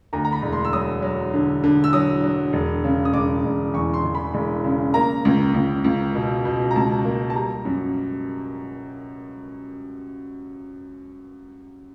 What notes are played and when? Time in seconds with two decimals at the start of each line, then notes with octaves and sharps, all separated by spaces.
0.13 D2 A#5
0.25 A#5
0.32 B5
0.42 E1
0.52 C6
0.65 E6
0.73 F#3 D#6
1.02 F#3
1.33 D3
1.64 D3
1.84 E6
1.93 F#3 D#6
2.23 F#3
2.53 E1
2.84 C#3
3.05 D#6
3.13 E1 D6
3.44 E1
3.74 E2 C#6
3.94 C6
4.05 E1
4.15 B5
4.34 E1
4.64 C#3
4.94 A#3 A#5
5.25 C#2
5.54 C#2
5.84 C#2
6.15 B2
6.45 B2
6.71 A#5
6.76 C#2 A5
7.05 A#3
7.30 A5
7.35 G3 A#5
7.65 F#2